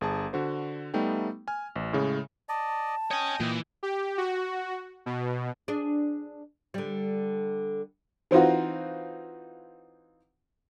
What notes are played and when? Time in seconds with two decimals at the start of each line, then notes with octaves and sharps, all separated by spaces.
0.01 G1 G#4 A5
0.33 D3 F#4 C5
0.94 G3 A3 B3 D#4 G5
1.48 G#5 F6
1.76 A1
1.93 A2 C#3 G#3
2.49 D5 D#5 A5
3.11 C#5 D#5 G5 G#5 D#6
3.40 A#2 E3
3.83 G4
4.18 F#4
5.06 B2
5.68 D4 G#4
6.74 D3 G3
8.31 E3 C4 D#4 F4 F#4